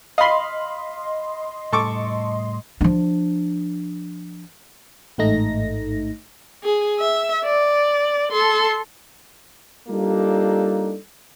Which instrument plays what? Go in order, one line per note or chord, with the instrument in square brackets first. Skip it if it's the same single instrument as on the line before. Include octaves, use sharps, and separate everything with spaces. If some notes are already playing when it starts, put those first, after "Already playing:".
[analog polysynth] D#5 C6 [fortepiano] F5 B5
[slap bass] A2 G3 [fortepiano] A4 C#6 D6
[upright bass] F3 D4
[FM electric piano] A1 G#2 A3 D#4 A#6
[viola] G#4
E5
D5
A4 C6
[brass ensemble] G3 A#3 D4 D#4 F4 A4